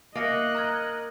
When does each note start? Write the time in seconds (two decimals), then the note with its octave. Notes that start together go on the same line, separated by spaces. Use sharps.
0.15 A#3 D#5 E5 F#6 A#6 C#7
0.55 A#5 F6 G#6